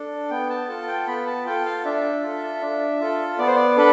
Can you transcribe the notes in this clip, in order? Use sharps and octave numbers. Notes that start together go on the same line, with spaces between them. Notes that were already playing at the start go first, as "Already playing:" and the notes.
Already playing: D4 A4
B3 G5
A5
F4 A4 A5
G5
B3 B5
A5
F4 A4 G5
F5
D4 E5
F4 A4
D4
F4 A4
B3 D5
C5
D5
D4 A4 B4